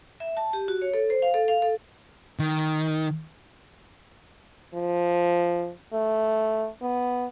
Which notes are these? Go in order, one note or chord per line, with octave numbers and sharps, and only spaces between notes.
E5
A5
G4
F#4
C#5
A4
C5
F5
A4
F5
A4
D#3
F3
A3
B3